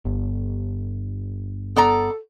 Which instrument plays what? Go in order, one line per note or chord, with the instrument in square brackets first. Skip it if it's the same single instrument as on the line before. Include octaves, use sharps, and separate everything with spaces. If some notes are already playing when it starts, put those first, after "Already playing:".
[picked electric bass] G1
[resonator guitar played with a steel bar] B3 D5 A#5 [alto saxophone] A4